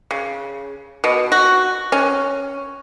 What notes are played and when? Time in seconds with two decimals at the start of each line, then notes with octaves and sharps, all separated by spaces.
0.11 C#3
1.04 B2
1.32 F#4
1.92 C#4